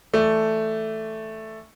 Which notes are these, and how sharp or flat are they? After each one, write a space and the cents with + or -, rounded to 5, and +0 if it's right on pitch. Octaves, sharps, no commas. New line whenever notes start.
E3 +0 A3 +0 D5 +0